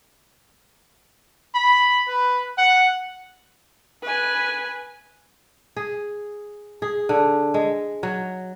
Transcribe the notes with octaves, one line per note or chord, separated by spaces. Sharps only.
B5
B4
F#5
B4 G#5
G#4
G#4
D3
G#3
F#3